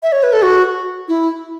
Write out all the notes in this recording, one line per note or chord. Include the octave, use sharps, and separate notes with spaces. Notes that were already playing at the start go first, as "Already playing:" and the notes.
E5
C#5
B4
A4
F#4
E4